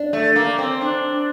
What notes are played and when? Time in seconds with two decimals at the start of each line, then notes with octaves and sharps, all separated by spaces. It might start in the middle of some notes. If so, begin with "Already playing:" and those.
Already playing: D4
0.13 A3
0.36 A#3
0.58 C4
0.81 D4